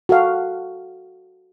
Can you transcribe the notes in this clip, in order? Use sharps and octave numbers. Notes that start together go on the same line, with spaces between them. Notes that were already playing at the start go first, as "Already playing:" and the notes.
F#4 A4 F5